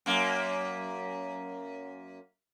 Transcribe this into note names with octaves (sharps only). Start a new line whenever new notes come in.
F#2 A#3